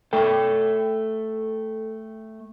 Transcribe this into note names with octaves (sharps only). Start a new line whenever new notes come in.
A3 A4 G5